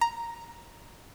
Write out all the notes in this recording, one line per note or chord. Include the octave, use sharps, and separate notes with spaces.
A#5